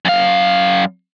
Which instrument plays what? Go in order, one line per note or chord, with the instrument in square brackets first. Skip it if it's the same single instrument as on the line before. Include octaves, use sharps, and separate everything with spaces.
[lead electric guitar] F#2 F5